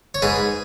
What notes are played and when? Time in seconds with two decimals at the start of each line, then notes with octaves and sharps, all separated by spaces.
0.14 C#5
0.22 G#2 G#4 B4